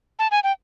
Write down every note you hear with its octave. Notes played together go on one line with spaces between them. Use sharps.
A5
G#5
G5